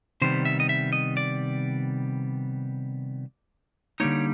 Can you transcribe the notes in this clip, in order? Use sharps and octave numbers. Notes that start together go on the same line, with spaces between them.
C3 D#3 G3 B3 C5
E5
D#5
E5
D#5
D5
D3 G3 A#3 D#4 C#5